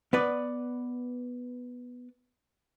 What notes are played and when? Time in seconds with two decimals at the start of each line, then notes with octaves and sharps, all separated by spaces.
0.13 B3 B4 D5